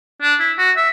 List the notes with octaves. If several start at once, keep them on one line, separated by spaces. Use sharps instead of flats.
D4
E4
F#4
E5